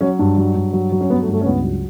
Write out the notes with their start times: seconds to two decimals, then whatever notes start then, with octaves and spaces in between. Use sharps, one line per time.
0.01 F#3 C#4
0.19 G2 D4
0.37 F#3
0.55 G2
0.73 F#3
0.92 F#3
1.01 C#4
1.10 G2 B3
1.22 A3
1.28 G2
1.33 A3
1.41 C#4
1.46 C#2 B3
1.64 F#3